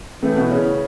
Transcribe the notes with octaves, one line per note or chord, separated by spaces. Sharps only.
A2 E3 A3
B2 B3
C#3 C#4